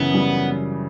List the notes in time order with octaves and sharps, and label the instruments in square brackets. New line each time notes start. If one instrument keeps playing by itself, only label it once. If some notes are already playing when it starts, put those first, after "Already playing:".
Already playing: [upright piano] F#2 C#3 E3 [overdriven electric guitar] B3
[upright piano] G3